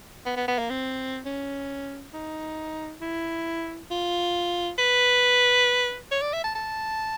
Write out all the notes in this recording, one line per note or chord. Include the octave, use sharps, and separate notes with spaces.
B3
B3
B3
A#3
C4
C#4
D#4
E4
F4
B4
C#5
D5
E5
A5
A5